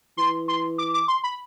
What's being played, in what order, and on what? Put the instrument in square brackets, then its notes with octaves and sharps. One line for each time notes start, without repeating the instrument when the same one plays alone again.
[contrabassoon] E3 [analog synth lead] C6
[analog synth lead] C6
D6
D6
C6
B5